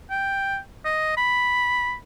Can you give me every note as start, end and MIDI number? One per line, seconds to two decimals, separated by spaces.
0.10 0.58 79
0.85 1.17 75
1.17 1.95 83